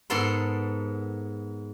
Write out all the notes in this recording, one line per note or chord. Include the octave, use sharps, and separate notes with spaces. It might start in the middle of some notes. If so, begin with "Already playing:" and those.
G#2 B3 A4 A#4 C6